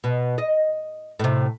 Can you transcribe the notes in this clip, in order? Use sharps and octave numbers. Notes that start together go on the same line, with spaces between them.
B2
D#5
A2 C3